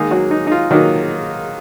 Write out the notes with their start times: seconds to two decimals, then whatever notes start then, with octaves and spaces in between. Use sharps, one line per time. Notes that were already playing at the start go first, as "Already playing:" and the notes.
Already playing: D#3 G#3 A#3 D#4 G#4
0.11 F#3 F#4
0.31 D#4
0.47 D#4
0.52 F4
0.71 D#3 F#3 A#3 D#4 F#4